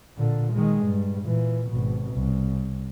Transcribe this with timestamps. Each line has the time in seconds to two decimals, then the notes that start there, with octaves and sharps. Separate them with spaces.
0.17 A#2 D3
0.53 D#3 G#3
0.85 G2
1.21 A#2 E3
1.70 G#1 B2
2.13 C2